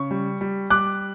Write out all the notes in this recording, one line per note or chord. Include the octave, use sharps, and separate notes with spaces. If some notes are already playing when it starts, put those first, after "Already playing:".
Already playing: C#3 C#6
G3
G3
G3 D6 F#6